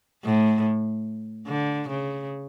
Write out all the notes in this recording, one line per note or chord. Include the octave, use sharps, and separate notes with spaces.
A2
D3
C#3